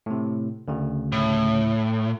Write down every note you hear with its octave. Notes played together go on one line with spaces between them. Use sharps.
A2 C3
D2 C#3
A2